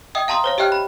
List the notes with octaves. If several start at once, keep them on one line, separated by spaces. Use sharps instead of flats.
D#5 E5 G5 D#6
F5 A5 A#5 C6 D#6
C5 C#5 F5
G4 D#5 E5 G5 F6 F#6
B5